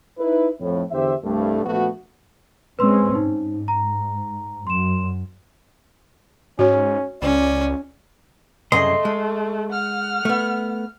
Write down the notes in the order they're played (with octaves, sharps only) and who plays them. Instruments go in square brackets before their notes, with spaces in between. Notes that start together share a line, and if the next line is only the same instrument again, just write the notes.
[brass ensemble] D#4 E4 B4
F2 A2
E2 D3 G4 C5 E5
C2 G2 A3
A#1 A3 B3 F#4
[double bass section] G#3 C4 C#4 [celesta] B4 C6 E6
[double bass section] G#2 [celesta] D#4
[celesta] A#5
[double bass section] F#2 [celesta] C6 E7
[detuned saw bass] G#2 [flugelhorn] C#4 [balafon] F#4 C#5
[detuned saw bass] C#2 [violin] C#4 [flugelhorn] D5
[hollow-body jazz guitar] C2 F#2 C#3 [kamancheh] A3 [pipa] D#5 [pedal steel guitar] C6
[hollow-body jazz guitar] G#3
[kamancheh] F#5 F6
[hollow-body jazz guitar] A3 B3